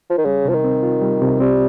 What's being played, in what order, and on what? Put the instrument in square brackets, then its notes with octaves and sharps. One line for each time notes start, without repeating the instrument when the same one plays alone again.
[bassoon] F3
D#3
[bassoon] C#3 [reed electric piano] G3
[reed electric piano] C3 [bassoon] F3
[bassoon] D#3
[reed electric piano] C4
F4
G3
C3
[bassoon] G3 [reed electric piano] C4